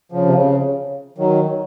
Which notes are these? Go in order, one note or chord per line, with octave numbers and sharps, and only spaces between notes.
C#3 F3
C3
C#3
D#3 F#3